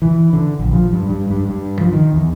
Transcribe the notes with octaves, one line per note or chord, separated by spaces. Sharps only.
E3
D3
A#1
F3
G2
G2
G2
G2
F3
D#3
E2